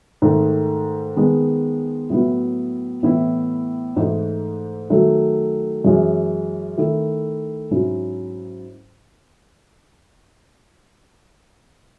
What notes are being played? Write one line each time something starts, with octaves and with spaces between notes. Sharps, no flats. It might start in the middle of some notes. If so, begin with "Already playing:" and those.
G#2 D#3 A3
D#3 G#3 B3
A2 F#3 B3 E4
A2 E3 B3 E4
G#2 E3 A3 D#4
D#3 F#3 A3
F#2 E3 G#3 C#4
D#3 A3 E4
G#2 F#3 C#4 E4